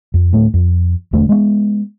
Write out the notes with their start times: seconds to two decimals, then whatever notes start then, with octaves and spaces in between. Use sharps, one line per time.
0.14 F2
0.33 D2 A2 A3
0.54 F2
1.13 D#1 E2 D3 A3
1.29 G#3 B3